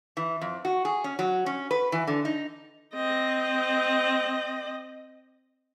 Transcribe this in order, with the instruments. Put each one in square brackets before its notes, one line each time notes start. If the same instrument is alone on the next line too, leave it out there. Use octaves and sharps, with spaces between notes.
[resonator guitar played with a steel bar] E3
F2
F#4
G#4
C#4
F#3
C#4
B4
E3
D3
D#4
[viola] C4 D#5